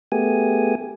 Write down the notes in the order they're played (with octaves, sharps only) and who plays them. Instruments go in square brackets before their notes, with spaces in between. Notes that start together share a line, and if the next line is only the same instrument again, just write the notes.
[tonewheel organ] A3 B3 G4 G#4 G#5